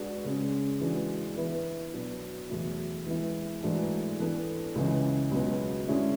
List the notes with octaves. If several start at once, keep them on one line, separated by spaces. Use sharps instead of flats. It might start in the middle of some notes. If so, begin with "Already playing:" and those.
Already playing: G#3 D4 F#4 B4
C#3 G#3 C#4
E3 G#3 D4 F#4
E3 B3 E4 B4
B2 F#3 B3 D4
E2 B2 F#3 A3 E4
E3 G#3 B3 E4
G#2 E3 A3 D4 F#4
E3 B3 D4 A4
C#2 C#3 E3
C#2 B2 F#3 B3
D3 G#3 C#4 E4